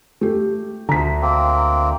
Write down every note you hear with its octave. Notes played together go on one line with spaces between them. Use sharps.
A3 G4
D2 D3 A#5 B6
A#3 C4